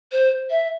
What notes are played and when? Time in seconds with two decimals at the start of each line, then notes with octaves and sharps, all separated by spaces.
0.12 C5
0.50 E5